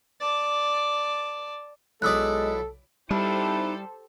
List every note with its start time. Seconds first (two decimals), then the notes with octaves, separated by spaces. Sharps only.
0.21 D5 A5
2.02 B1 G#3 E4 A4 D5 D#6 E6 F#6
3.11 G3 D#4 E4 G4 A4 C5 A5